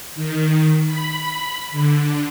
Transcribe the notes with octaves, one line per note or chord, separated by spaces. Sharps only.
D#3
B5
D3